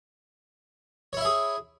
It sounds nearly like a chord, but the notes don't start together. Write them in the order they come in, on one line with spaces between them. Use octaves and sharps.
C#5 E4 E5 G#4